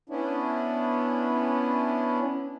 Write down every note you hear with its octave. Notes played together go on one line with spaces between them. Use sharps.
B3 C#4 D4 E4